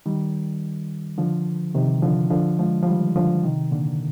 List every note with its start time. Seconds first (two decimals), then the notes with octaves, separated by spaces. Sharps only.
0.06 D#3 G3
1.18 D3 F3
1.74 C3 D#3
2.02 D3 F3
2.30 D3 F3
2.59 F3 G#3
2.83 F3
2.87 D#3 G3
3.16 D3 F3
3.43 C3 D#3
3.71 A#2 D3